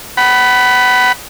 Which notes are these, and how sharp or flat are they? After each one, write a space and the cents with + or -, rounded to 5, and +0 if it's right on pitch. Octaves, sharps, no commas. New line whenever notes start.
F#5 +30 B5 +0